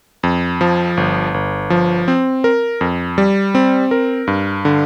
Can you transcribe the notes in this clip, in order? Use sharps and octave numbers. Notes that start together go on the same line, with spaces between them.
F2
F3
G1
G1
F3
C4
A#4
F2
G3
C4
A#4
G2
D3